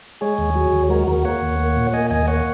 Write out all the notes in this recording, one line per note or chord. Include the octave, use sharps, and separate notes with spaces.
G#3 G#4 C#5
D#2
F#3
D#2
G#3 F#4 A#4
D#2 F#4 A#4
A#3 C#5 F#5
D#2
A#3
A#2
A#3 D#5 G#5
D#2 D#5 G#5
A#3 C#5 F#5